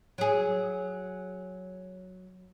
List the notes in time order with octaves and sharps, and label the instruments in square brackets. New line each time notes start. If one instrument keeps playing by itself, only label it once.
[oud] F#3 G#4